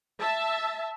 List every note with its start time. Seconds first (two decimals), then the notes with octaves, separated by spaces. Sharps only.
0.20 E5 A5